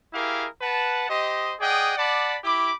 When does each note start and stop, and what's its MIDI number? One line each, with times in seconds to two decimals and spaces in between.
0.13 0.47 64
0.13 0.47 67
0.13 0.47 68
0.13 0.47 70
0.13 0.47 77
0.61 1.08 71
0.61 1.08 78
0.61 1.08 81
1.09 1.54 67
1.09 1.54 72
1.09 1.54 75
1.60 1.97 68
1.60 1.97 74
1.60 1.97 75
1.60 1.97 78
1.60 1.97 79
1.97 2.36 74
1.97 2.36 78
1.97 2.36 81
1.97 2.36 83
1.97 2.36 86
2.44 2.72 64
2.44 2.72 67
2.44 2.72 83
2.44 2.72 86